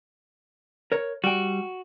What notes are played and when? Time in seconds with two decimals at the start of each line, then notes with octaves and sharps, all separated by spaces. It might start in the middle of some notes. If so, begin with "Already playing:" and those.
0.92 A#4 C#5
1.24 G3 F#4 G5